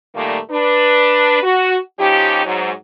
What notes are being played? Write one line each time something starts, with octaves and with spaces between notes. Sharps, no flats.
A#2 D#3 G3 A3 A#3
D4 B4
F#4
F3 C#4 D#4 G4
G#2 F#3